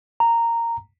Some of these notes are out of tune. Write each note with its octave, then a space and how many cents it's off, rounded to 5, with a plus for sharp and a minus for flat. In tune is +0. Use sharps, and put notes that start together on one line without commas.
A#5 -10